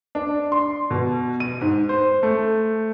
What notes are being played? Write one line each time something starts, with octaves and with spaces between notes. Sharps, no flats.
D4
C6
B2
D#7
G#2
C5
A3